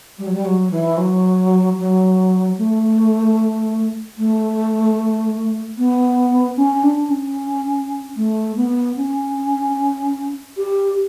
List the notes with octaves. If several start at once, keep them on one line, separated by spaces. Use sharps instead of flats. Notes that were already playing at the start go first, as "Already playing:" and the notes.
G3
F#3
G3
F#3
E3
F#3
F#3
A3
A3
B3
C#4
D4
C#4
A3
B3
C#4
G4